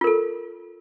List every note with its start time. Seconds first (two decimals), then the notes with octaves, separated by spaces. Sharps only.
0.01 F4
0.04 A#4
0.07 A4